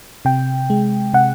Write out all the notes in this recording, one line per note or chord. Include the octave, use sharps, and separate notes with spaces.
C3 G5
G#3
C3 F#5